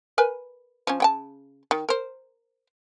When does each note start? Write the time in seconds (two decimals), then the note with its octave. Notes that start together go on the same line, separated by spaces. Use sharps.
0.18 A#4 B4 G#5
0.87 F3 C#4
1.00 C#3 G5 A5
1.71 D#3
1.89 A#4 C5